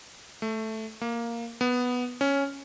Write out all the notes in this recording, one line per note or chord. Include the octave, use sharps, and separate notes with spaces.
A3
A#3
B3
C#4